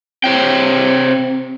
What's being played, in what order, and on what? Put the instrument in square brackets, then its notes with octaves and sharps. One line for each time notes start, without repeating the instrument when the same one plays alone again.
[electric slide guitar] C3 C#5 G5 [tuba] C4